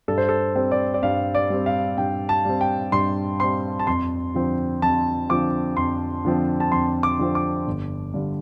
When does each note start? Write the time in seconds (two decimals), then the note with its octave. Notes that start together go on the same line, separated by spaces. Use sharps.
0.08 G2 A4
0.18 C5
0.29 A4
0.56 G3 C4
0.72 D5
0.94 D5
1.03 G2 F5
1.35 D5
1.50 G3 C4
1.66 F5
1.98 G2 G5
2.29 A5
2.45 G3 C4
2.61 G5
2.92 G2 C6
3.40 G3 C4 C6
3.79 A5
3.87 F2 C6
4.34 D3 F3 C4
4.82 F2 A5
5.29 D3 F3 C4 D6
5.77 F2 C6
6.25 D3 F3 C4
6.60 A5
6.72 F2 C6
7.03 D6
7.19 D3 F3 C4
7.35 D6
7.67 G1
8.14 G2 D3